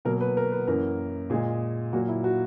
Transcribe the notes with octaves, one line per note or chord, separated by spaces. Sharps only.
B2 F#3 A#3 A#4
B4
A#4
B4
F#2 E3 A#3 A#4
A#2 G#3 G#4
A#2 F#3 A#3 F#4
E4
F#4